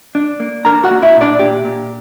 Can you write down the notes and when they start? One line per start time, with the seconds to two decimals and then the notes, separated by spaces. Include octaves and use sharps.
0.15 D4
0.40 A#3
0.65 D4 A#4 A#5
0.84 F#4 F#5
0.91 A#3
1.02 E4 E5
1.15 A#2
1.21 D4 D5
1.39 A#2 G4
1.65 A#2